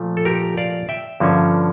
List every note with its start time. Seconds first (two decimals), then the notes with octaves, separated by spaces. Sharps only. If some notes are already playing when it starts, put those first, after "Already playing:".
Already playing: A#2 F3 A3
0.17 A4
0.25 G4 A#4
0.57 D5 F5
0.89 E5 G5
1.20 G2 D3 F3 A#3 C#4